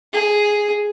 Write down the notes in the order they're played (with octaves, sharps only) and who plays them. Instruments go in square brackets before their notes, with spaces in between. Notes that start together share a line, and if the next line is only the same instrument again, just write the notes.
[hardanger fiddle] G#4